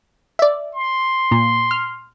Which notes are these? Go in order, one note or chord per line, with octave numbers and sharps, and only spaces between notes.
D5 E5
C6
A#2
F6